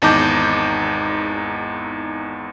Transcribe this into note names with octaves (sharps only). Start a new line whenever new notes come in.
G#1 E2 D#4 A5 D6 G6